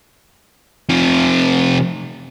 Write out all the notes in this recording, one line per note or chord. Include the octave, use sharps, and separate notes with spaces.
C3 F3